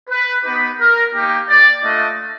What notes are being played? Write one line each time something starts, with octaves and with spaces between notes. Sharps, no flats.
B4
B3 D#4 G4 B4
A#4
A#3 D#4 G4
D5
A3 D4 F4 D#5